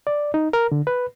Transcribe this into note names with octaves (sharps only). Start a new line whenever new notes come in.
D5
D#4
A#4
D3
B4